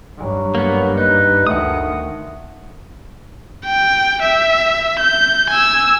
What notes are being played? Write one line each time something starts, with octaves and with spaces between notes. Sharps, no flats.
G2 F#3
A#3 B3
D#4 B4
D2 D#3 A3 F#5 D#6
G5
E5
G6
G#5 E6